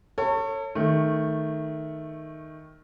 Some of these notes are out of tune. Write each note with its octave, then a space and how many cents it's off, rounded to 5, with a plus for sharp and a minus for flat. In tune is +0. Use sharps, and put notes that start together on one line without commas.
A4 +35 C#5 -10
D#3 +0 A3 +0